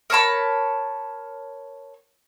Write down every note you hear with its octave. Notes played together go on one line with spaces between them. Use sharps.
A#4 C#5 A5 B5